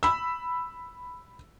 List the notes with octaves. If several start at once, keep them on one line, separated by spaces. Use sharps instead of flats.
B5 E6